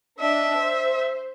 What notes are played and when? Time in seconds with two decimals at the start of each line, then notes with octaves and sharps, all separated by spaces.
0.20 D4 D#5 E5
0.58 C5